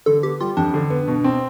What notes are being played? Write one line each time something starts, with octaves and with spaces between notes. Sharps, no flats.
D3 A4
B3 G4
G3 F4
F2 D4
D3
B3
B2
C4